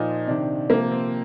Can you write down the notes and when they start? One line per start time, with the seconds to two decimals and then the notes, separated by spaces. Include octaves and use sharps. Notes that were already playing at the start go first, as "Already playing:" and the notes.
Already playing: A#2 F3 D#4
0.27 C3 D#3 D4
0.70 C3 F3 A#3
0.91 C4